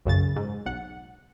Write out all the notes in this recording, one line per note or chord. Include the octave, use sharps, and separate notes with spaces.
B1 F#2 C#3 A6
G#2
B1 F#5